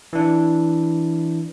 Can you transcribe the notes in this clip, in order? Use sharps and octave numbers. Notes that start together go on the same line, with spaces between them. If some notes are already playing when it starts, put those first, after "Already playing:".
E3 D4